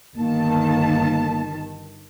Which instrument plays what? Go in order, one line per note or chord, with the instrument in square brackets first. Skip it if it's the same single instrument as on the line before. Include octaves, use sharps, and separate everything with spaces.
[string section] G1 D#3 A5 [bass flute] A#3